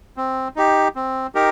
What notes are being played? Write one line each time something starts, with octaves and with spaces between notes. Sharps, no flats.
C4
D#4 G4
C4
D#4 G4 A#4